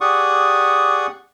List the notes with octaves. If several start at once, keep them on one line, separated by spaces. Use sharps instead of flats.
G4 G#4 D5 F#5 C#6 D#6